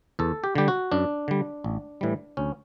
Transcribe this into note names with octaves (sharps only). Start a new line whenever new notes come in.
E2 A4
G4
D3 G3 G4
F#4
F#2 D4
D3 G3
A1
A2 E3 G3
D2 C#4